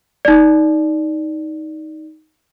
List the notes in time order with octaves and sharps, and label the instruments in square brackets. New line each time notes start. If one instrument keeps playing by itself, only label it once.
[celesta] D#4 D5